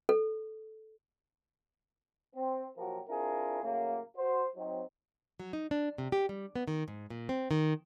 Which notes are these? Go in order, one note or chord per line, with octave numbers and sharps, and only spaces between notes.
A4
C4
A#2 F3 F#3 F#4 G4 A#4
C4 D4 E4 F4 G#4 A#4
A2 C#3 F#3 A#3
F#4 C5
F#3 C4 D#4
F#3
D#4
D4
C3
G4
G3
B3
D#3
G#2
A#2
C4
D#3